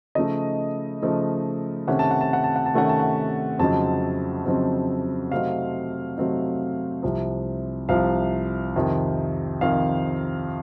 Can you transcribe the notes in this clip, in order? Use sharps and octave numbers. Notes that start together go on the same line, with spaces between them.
C#3 F3 A3 D#4 D#5
C#3 F3 A3 D#4
C3 D#3 A3 C#4 F#5
A5
F#5
A5
F#5
A5
F#5
A5
C3 D#3 A3 C#4 F#5
A5
F#5
F2 C#3 F#3 C4 D#4 A5
F2 C#3 F#3 C4 D#4
C3 F#3 A3 C4 D#4 F5
C3 F#3 A3 C4 D#4
C2 C3 F3
C2 C3 F3 F5
F2 C3 D#3
F2 C3 D#3 F5